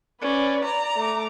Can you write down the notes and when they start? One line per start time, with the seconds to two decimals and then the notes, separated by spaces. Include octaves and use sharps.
0.22 C#4 B4 D5
0.65 D5 A#5
0.97 A3 D6